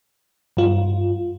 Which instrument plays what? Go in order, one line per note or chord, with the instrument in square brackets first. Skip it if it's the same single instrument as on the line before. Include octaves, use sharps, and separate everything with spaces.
[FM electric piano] G2 F4